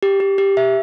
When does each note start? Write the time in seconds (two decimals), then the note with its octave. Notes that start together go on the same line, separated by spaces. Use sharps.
0.03 G4
0.20 G4
0.38 G4
0.57 E5